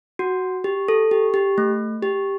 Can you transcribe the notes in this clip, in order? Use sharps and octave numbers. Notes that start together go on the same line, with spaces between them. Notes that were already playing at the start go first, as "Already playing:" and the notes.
F#4
G4
A4
G4
G4
A3
G4